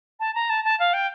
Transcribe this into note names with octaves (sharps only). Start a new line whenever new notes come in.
A5
A#5
A5
A5
F5
G5